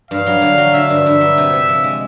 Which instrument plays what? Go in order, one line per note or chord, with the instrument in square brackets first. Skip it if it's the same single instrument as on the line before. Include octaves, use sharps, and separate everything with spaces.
[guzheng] G2 [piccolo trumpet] F5
[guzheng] F#3
D3
F#3
[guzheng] D3 [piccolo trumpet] E5
[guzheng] G2
G2
F#3
C3
C3
F3
G#3